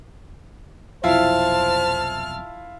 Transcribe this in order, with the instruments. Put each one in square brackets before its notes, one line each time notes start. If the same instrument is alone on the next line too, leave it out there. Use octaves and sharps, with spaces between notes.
[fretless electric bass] F1 B1 F2 [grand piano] E4 F4 [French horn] C5 [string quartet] A5 F6